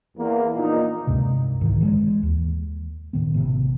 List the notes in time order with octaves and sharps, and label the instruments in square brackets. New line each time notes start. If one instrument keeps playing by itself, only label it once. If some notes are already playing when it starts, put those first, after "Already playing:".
[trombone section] E2 A#3
A#1 A#2 D#4
[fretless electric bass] C#2 G2 C3
B1 G#2 D#3 E3
E3 F#3 G#3
D#2
A2 D#3 B3
A1 C3